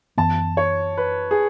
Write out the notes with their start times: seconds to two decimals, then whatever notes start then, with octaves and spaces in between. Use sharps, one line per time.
0.18 F#2 E3 B3 A5
0.57 C#5
0.98 B4
1.31 G#4